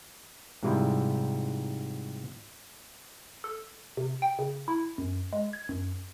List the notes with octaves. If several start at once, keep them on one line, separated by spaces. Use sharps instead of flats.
G#2 C3 F3 G3 E4
A4
C3
G5
C#3
E4
F#2
G#3
G#6
F#2